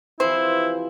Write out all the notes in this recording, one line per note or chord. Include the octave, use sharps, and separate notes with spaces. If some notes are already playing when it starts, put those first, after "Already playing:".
C3 E3 F3 E4 C5